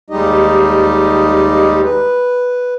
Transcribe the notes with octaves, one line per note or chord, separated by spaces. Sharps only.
D#2 G3 G#3 D#4 G4 D#5
B4